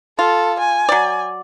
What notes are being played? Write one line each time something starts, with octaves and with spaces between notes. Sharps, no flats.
F4 A4
G#5
F#3 D5